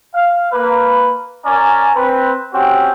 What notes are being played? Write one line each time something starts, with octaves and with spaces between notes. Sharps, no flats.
F5
A#3 B4
C#4 A#4 D5 G#5 A#5
C4 B4
C4 C#4 F#4 G4